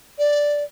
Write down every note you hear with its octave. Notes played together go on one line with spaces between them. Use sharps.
D5